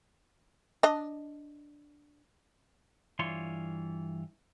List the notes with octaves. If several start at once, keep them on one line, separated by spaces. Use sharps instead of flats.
D4 D#5
G2 E3 F4 C#5 C6